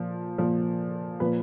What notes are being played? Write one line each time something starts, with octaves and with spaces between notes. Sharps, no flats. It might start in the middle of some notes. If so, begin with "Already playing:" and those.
Already playing: A#2 F3
A#2 F3
A#2 F3 B4